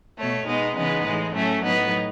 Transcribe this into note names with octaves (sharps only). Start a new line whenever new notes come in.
B2 A3 C#5
B2 G#3 B3 D#4
C#3 E3 G#3 B3 D#4
A2 E3 G#3
A2 F#3 A3 C#4
A2 F#3 B3 D#4